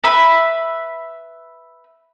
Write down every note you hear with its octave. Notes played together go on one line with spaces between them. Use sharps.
B4 E5 B5